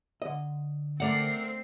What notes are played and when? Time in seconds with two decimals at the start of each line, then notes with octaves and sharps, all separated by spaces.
0.22 D3 D#5
1.00 A3 C4 A#4 D5 E5 F#5 C7